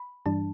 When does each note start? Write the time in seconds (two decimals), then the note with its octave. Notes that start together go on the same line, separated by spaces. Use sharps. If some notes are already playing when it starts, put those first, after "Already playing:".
Already playing: B5
0.26 G2 E3 G3 D4 A5